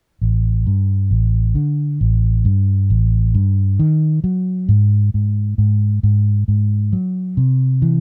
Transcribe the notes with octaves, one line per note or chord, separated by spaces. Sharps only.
A1
G2
A1
D3
A1
G2
A1
G2
D#3
F#3
G#2
G#2
G#2
G#2
G#2
F#3
C3
E3